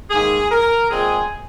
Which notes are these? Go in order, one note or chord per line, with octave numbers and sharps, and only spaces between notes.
G#2 D#3 A#3 G#4
A#4
A#2 G#3 C4 G#4